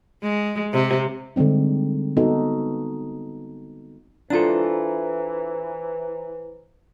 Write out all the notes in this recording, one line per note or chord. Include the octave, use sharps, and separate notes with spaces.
G#3
C3
D3 G3 G#3 C4 D#4
B3 D#4 F#4 A4
E3 D4 F4 A4 C5 A#5